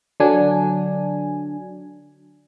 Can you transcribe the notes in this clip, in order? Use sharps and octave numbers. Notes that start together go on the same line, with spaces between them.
D3 F#3 D4 G#5